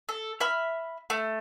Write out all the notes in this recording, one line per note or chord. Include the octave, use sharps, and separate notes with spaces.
A4
E5 B5 F6
A3